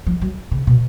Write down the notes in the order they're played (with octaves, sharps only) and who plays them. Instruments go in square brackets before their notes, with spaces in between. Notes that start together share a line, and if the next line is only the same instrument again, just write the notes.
[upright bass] F3
F#3
C#3
B2